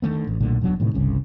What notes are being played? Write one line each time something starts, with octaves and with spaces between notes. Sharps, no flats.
D3 D#3 A3 B3
A1
B1 A#2 D3 A3
E1 B2 F#3 D4
A2 C3 D#3 E3
G1 C2 C#3